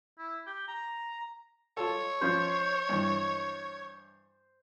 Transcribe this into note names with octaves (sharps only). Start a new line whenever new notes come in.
E4
G4
A#5
F4 A4 C#5
F3 C#4 C5
G2 E3